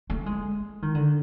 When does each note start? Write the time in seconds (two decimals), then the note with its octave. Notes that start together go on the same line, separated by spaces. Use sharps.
0.10 A3
0.26 G#3
0.82 D#3
0.95 D3